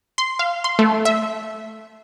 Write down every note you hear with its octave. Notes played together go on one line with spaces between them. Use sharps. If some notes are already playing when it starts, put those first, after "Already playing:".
C6
F5
C6
A3
E5